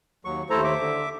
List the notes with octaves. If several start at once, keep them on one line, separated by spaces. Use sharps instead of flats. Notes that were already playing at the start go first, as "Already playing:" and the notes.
D#2 F#3 C#6
D#2 A3 E4 A4 C5 A#5
E5 D6
D3